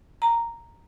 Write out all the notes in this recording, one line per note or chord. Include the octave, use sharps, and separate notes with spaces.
A#5